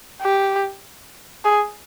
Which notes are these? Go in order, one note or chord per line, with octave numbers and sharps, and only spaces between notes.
G4
G#4